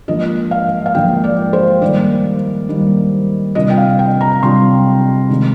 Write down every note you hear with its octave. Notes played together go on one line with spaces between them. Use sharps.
G#2 F3 A#3 D4 F4 D#5
F5
F5
G#2 F3 A#3 D4 F4 G5
D5
C5
D#3 G3 A#3 D5
D#3 G3 A#3
C3 G3 D4 F4 D#5
G5
F5
G5
A#5
C3 G3 D4 F4 C6
C3 D#3 G#3